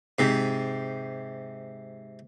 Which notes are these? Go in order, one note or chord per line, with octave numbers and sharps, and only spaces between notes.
G#2 C3